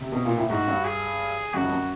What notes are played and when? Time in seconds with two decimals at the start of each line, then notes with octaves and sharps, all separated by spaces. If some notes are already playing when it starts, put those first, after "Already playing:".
0.00 C3
0.12 B2
0.25 A#2
0.37 A2
0.50 G#2 F#4
0.67 G2
0.85 G#4
1.54 F#2 F#4
1.62 F2
1.70 F#2